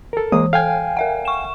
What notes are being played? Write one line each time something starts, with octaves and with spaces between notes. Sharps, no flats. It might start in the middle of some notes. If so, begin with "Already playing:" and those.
A4 A#4
E3 G#3 A#3 D#6
A4 F5 G5 G#5
A#4 E5 F#5
C#6 E7